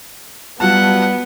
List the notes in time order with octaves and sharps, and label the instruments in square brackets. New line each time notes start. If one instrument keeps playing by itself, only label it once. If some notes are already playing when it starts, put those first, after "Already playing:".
[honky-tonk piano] F#3 F4 A5 [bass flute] G3 [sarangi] B3 [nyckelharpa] F#5